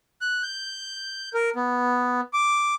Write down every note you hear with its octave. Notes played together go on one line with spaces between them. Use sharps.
F#6
G6
A#4
B3
D6